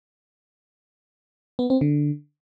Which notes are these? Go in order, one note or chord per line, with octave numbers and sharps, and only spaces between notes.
B3
C4
D3